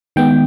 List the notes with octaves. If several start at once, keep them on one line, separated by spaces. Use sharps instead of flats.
D#3 G#3 B3 G5